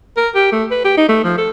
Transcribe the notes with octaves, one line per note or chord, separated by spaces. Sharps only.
A#4
G4
A3
B4
G4
D#4
A3
F3
A4